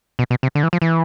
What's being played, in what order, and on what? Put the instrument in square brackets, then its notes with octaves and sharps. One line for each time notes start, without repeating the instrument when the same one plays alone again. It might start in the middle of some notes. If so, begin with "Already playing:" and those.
[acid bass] B2
B2
C3
D3
E3
F3
E3